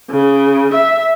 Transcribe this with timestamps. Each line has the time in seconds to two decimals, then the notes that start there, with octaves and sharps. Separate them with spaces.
0.10 C#3
0.74 E5